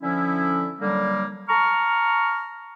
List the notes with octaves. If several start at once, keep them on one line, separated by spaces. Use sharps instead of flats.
D3 F3 C#4 E4
D3 F#3 G3 A#3
A5 A#5 C#6 F6